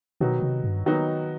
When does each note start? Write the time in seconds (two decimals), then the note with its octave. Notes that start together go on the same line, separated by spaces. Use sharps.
0.21 B2 D#3 F#3 B3 D#4 F#4
0.42 C3
0.64 G2
0.86 D#3 F#3 B3 D#4 F#4